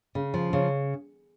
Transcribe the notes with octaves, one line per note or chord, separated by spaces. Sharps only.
C#3
F3
C#3